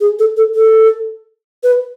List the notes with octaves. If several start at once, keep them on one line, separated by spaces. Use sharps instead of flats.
G#4
A4
A4
A4
B4